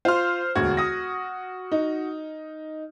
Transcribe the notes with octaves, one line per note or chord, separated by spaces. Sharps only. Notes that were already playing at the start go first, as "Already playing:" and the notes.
F4 C5 C6 F6
E1 D2 F#4 G#6
D#6 A#6
D#4